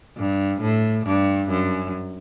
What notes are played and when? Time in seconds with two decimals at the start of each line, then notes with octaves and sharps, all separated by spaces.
0.17 G2
0.61 A2
1.06 G2
1.50 F#2